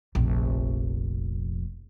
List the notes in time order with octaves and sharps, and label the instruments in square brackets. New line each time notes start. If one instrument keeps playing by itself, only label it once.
[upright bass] F1 A#1